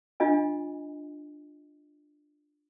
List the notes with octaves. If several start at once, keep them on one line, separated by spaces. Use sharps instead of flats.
D4 F4 D#5 G#5